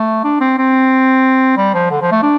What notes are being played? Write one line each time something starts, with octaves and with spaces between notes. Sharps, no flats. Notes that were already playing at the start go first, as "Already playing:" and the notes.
Already playing: A3
D4
C4
C4
G3
F3
D3
F3
A3
D4